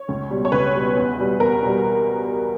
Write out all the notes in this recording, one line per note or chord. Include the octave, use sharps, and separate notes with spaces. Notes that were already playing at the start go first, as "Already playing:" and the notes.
Already playing: C#5
C#2
B2 G3
C#5
C#2 B4
B2 G3
E2
B2 G3
E2 A#4
B2 G3